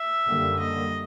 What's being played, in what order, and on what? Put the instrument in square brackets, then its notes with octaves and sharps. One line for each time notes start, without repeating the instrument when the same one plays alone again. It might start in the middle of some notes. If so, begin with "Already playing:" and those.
Already playing: [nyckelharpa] E5
[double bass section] F#2 D3 G3 A#3
[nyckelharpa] D#5